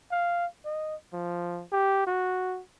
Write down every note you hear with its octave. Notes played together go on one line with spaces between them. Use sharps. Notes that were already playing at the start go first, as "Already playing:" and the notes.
F5
D#5
F3
G4
F#4